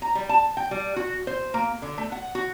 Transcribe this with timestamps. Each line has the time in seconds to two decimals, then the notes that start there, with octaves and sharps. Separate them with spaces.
0.02 A#5
0.15 G3
0.29 A5
0.57 G5
0.71 G3
0.96 F#4
1.27 C5
1.54 A#3
1.82 D3
1.98 A3
2.12 F#5
2.35 F#4